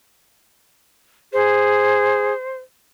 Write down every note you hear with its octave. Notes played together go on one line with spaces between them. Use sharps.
G#4 C5